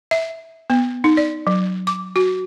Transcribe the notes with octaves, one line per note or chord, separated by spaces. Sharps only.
E5
B3
D#4
D5
F#3
D6
F#4